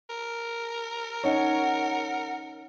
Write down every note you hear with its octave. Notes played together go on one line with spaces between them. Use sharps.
A#4
C#4 D#4 C#5 F#5